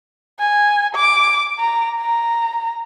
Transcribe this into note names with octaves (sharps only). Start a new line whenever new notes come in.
G#5
D6
A#5
A#5